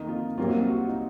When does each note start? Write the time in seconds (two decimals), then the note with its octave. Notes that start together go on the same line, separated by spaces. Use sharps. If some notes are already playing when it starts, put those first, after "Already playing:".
Already playing: F2 D#3 A#3 D#4
0.08 F4
0.37 C2 C3 F#3 A#3 F4
0.68 F#4
0.78 F4
0.88 D#4